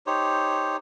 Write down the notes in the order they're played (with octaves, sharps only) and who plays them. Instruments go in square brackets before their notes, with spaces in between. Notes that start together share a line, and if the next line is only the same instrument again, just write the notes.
[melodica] D#4 G4 C5 C#5